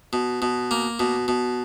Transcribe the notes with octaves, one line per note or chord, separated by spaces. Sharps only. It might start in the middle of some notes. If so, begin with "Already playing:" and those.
B2
B2
A#3
B2
B2